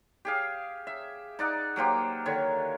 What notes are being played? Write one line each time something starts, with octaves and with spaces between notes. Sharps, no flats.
G4 G#4 F5
E5
D#4 D5 F#5
F#3 A#3 G4 C5
D3 D#3 C#5